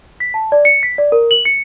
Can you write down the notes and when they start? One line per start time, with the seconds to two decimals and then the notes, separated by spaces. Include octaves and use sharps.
0.20 B6
0.34 A5
0.52 D5
0.65 C#7
0.83 B6
0.98 D5
1.12 A#4
1.31 F#7
1.45 C#7